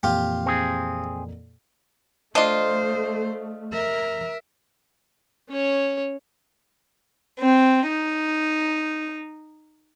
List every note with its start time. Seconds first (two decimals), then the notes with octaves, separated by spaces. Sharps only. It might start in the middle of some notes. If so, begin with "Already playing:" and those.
0.03 F2 A#2 E3 F4 G4
0.46 C4 G#4
2.35 A3 D4 F4 C5 D#5
3.72 A#4 E5
5.49 C#4 C#5
7.40 C4
7.87 D#4